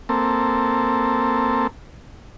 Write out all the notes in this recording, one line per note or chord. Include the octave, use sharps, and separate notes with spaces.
A#3 C4 A4